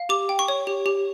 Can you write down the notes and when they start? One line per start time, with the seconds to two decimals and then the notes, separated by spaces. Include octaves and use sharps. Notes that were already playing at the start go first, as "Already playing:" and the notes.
Already playing: F5
0.09 G4 D6
0.29 G5
0.39 C#6
0.48 C#5
0.67 G4
0.86 G4